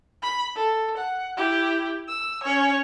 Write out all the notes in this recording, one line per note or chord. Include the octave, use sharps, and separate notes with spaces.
B5
A4
F#5
E4 G4
E6
C#4 C#5